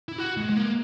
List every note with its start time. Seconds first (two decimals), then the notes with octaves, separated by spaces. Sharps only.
0.09 E4
0.18 F#4
0.37 G#3
0.50 G#3
0.56 A#3